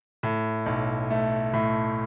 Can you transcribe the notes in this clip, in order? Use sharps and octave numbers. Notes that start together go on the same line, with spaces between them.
A2
B1
A3
A2